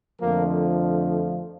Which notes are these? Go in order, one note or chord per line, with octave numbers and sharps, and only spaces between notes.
F2 D3 F3 A3 A#3